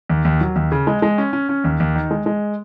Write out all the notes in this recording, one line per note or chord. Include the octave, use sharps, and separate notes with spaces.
D#2
D#2
F#3
D#2
C#3
G#3
G#3
C#4
C#4
C#4
D#2
D#2
D#3
G#3
G#3